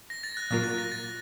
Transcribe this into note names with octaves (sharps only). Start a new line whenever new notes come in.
A#6
A6
F#6
A#2 F#3 A#3 F4 A#4 F#6
A6
A#6
A6